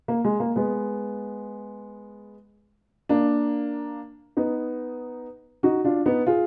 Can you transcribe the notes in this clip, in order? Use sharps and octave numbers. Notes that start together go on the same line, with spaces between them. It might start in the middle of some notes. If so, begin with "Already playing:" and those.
A#3
G#3
A#3
G#3 B3
A#3 D4
B3 D#4
D#4 F#4
D4 F4
B3 D#4
F4 G#4